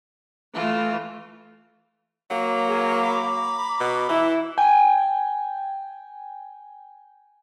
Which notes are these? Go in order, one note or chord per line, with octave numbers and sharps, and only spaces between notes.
E3 A3 F4
F#3 A#3
G#4 F5
A#5 B5 D6
B2
E3 E4
G5 G#5